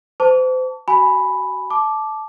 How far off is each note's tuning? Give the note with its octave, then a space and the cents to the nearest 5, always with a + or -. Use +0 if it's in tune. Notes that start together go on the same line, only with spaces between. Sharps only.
C5 -35 A5 +10 D6 -45
F#4 +25 G#5 +5 B5 +0
A5 -15 D6 +0